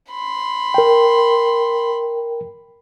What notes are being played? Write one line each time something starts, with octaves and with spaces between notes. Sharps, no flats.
B5 C6
A#4 G5